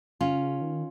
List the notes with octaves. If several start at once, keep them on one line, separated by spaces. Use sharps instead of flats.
C#3 C#4 F4
D#3